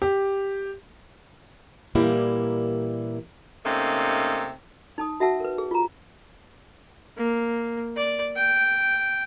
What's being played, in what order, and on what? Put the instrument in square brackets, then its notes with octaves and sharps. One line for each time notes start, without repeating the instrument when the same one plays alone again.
[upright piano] G4
[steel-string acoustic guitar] A#2 E3 G3 A#3 E4 G4
[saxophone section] C3 A3 A#3 C#4 D#4
[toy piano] D#4 A5 D#6
F#4 E5 F#5 A5 E6
A#4 B4
G#4
F4 A#5
[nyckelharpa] A#3
D5
G5